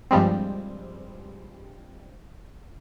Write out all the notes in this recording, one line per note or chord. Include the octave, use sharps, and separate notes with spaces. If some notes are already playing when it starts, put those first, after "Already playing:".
G2 F3 G3 G#3 C4